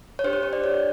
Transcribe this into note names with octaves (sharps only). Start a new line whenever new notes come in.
C#5
D4 G4 C5
C#5
C#5
D5
D4 G4 C#5